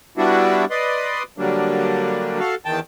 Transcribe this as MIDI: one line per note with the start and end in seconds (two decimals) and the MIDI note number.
0.18 0.65 55
0.18 0.65 59
0.18 0.65 62
0.18 0.65 64
0.18 0.65 66
0.71 1.23 71
0.71 1.23 74
0.71 1.23 75
0.71 1.23 84
1.38 2.39 50
1.38 2.39 54
1.38 2.39 55
1.38 2.39 58
1.38 2.39 62
2.39 2.55 66
2.39 2.55 69
2.39 2.55 77
2.65 2.80 40
2.65 2.80 51
2.65 2.80 79
2.65 2.80 81